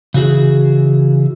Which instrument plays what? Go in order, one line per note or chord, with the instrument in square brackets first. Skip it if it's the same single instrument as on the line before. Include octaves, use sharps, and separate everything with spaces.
[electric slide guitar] C#3 E3 F#4 G#4